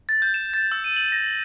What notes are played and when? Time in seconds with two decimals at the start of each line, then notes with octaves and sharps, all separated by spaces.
0.09 A6
0.22 G6
0.34 E7
0.54 A6
0.72 E6
0.84 D#7
0.96 F#7
1.12 A#6